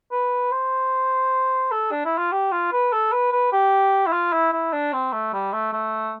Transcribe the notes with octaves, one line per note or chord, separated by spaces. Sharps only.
B4
C5
A4
D4
E4
F4
G4
F4
B4
A4
B4
B4
G4
E4
F4
E4
E4
D4
C4
A3
G3
A3
A3